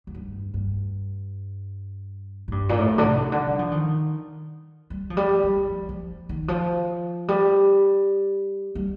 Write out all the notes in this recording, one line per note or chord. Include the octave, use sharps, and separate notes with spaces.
F2
G2
G2
A2
G2
A#2
A2
D3
C3
D3
G3
F3
D#3
G3
F3
G3
G3
F3
F3
D#3
F3
G3
G3